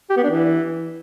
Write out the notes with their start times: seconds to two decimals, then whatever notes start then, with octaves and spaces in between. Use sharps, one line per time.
0.10 G4
0.17 B3
0.23 D4
0.30 E3